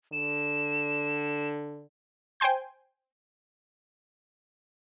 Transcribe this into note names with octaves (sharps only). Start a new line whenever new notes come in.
D3 E7
C5 G5 G#5 C6 G6